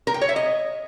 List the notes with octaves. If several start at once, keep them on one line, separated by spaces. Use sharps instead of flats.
A#4
G5
C#5
E5
D#5